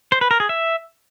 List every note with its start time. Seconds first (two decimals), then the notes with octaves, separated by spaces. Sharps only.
0.12 C5
0.21 B4
0.31 A#4
0.40 G#4
0.49 E5